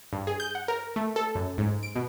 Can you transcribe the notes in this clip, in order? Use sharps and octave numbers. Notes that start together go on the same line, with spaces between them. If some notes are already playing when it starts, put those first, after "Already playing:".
G2
G#4
G6
F#5
A#4
A3
A4
F#2
G#2
D7
B2